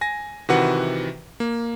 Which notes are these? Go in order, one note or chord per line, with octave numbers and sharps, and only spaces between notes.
G#5 A#6
C3 D#3 E3 F#4 B4 F#5
A#3